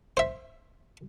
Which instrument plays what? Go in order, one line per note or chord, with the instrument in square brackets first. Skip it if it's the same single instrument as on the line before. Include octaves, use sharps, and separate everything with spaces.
[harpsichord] C5 E5